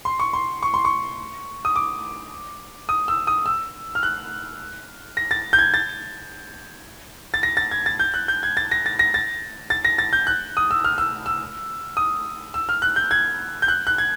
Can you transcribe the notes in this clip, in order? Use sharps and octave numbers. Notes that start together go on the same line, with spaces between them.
C6
C#6
C6
C#6
C6
C#6
D#6
D6
D#6
E6
D#6
E6
F6
F#6
A#6
A6
G6
G#6
A6
A6
A#6
A6
G#6
A6
G6
F#6
G6
G#6
A6
A#6
A6
A#6
A6
A6
A#6
A6
G6
F#6
D#6
E6
F6
E6
E6
D#6
E6
F6
F#6
G6
G#6
G6
F#6
F#6
G#6